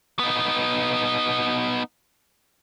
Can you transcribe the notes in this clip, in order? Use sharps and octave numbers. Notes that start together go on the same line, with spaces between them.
B3 D#4